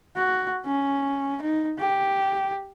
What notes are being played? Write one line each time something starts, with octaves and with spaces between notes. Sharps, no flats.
F#4
C#4
D#4
G4